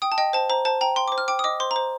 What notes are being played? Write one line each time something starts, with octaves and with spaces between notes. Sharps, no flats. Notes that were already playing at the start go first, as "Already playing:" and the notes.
G5 D#6
A5
D#5 G5
C5 A5
C5 A#5
C5 A5
G5 A#5
G5 C6
D6
C5
F6
G5 D6
D#6
D#5 D6
C5 C6
A#5
C5